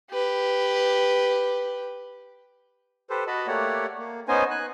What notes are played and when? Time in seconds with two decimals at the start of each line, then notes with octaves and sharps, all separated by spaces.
0.11 G4 B4
3.10 G4 A4 B4 C5
3.27 F#4 D#5 A5 B5
3.47 A3 A#3 G4 C#5 D5 F#5
3.98 A#3
4.28 B3 C#4 D#4 C5 D#5 G#5
4.51 G#5 F#6